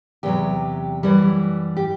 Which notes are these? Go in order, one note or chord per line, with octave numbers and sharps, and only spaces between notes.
E2 C3 F#3 G4
F#2 E3 G3
G4